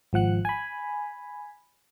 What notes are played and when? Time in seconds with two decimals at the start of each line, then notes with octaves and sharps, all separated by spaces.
0.13 G#1 F3 F#5 F#6
0.45 G#5 B5